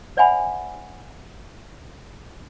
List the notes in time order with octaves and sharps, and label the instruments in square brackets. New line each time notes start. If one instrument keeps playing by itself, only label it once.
[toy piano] C5 D5 E5 F#5 G#5 B5